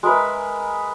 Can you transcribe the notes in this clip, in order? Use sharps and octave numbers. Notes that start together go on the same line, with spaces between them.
G#3 A#4 B4 E5